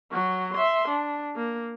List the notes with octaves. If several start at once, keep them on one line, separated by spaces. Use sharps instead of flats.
F#3 F#4
E5 C6
D4
A#3